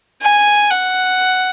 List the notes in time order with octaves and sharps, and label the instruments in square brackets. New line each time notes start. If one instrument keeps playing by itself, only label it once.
[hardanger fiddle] G#5
F#5